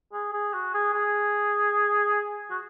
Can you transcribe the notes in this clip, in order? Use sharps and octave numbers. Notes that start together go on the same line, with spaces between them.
G#4
G#4
F#4
G#4
G#4
F#4